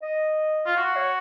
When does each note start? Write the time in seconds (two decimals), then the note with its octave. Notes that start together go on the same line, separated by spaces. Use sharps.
0.02 D#5
0.66 F4
0.77 F#4 F5
0.96 C#5